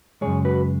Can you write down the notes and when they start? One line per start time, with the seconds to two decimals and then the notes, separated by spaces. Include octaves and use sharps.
0.21 F#2 C#3 E3 G#3 G#4 C#5
0.45 F#4 B4